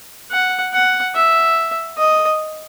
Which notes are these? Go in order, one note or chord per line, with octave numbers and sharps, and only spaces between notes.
F#5
F#5
E5
D#5